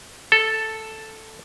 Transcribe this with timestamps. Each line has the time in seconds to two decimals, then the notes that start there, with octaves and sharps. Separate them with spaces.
0.32 A4